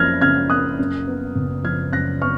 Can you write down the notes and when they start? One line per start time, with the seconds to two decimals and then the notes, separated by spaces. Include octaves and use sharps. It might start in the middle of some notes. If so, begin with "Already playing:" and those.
Already playing: F#2 F3 A#3 F6 G#6 A#6
0.21 C#3 F6 G#6
0.50 A#3 D#6 F#6
0.79 F#2
1.07 B3
1.35 F#1
1.64 F3 F6 G#6
1.92 F#2 F#6 A#6
2.21 B3 C#6 F6